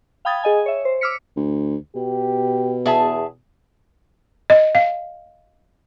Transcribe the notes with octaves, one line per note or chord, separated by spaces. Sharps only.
F5 G5 B5 D#6 G#6 A6
G#4 D#5 G#5
C#5 E5
C5
D6 E6 F6 B6 C#7
D2
B2 G4
E2 G#4 E5 A5
D#5
F5